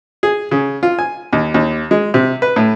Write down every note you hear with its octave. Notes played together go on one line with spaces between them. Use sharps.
G#4
C#3
F4
G#5
D#2
D#2
G#3
C3
B4
A2